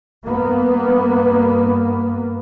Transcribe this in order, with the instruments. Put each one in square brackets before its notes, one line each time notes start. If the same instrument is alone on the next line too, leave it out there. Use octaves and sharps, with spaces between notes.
[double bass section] G2 A#3 B3